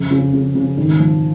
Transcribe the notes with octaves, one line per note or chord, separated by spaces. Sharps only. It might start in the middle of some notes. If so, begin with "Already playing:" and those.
Already playing: F2 C#3
C#3
C#3
C#3
G#1
F3